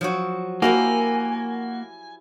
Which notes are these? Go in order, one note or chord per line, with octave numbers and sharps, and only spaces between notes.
F3 F#3 F#4
A#3 E4 F#4 G4 A#4 G#5